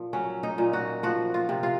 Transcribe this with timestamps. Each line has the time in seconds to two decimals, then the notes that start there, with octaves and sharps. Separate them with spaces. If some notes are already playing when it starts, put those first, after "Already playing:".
Already playing: A#2 F3
0.13 F#3 C#4
0.43 D#4
0.58 A#2
0.73 F#4
1.03 F3 F#4
1.34 F4
1.49 C3
1.63 F4